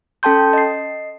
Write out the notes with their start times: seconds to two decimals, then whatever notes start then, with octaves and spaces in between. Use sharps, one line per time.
0.23 C#4 A4 G5 A5 C6 G6
0.53 D#5 C7